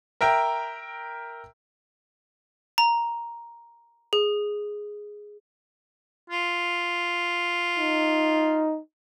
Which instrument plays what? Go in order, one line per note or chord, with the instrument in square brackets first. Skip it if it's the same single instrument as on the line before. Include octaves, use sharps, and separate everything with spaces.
[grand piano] A#4 E5 G5 A#5
[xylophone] A#5
G#4
[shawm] F4
[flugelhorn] D#4